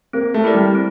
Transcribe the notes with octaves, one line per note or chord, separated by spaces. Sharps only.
A#3 C4
A3
E4 G4 A#4 D5
G3
C4